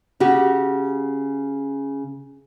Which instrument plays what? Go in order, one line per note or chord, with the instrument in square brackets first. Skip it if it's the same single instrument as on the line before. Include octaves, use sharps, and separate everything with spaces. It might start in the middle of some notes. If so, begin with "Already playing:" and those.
[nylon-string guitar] C#3 F#4 G4